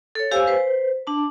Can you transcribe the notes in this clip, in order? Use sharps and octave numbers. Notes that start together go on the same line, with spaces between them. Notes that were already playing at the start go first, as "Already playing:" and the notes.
A4 C#5
G4 C5 F5 G#5 E6
B4 C5
D4 A5